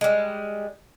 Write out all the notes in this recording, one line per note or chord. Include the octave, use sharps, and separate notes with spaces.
G3 G#3